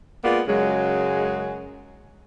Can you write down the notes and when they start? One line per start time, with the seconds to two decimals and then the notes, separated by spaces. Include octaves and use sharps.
0.24 G#3 A#3 B3 F4 D5
0.48 F#2 C#3 F#3 G#3